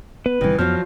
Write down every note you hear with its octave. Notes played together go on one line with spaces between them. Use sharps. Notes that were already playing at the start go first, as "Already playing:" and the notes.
B3 B4
G1 C3 D#3 E3 G3
F2 F3 F#3 B3 F6